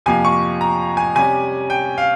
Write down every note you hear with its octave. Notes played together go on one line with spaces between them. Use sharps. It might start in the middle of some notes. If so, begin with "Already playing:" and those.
F2 C3 F3 A#3 G#5
C#6
A#5
G#5
C3 G3 C#4 G#5
G5
F5